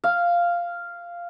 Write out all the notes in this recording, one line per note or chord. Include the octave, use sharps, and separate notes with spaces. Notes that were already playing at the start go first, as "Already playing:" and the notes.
F5